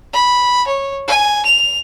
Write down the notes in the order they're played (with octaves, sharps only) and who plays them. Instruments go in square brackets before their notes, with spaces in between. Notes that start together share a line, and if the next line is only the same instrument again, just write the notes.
[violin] B5
C#5
G#5
F7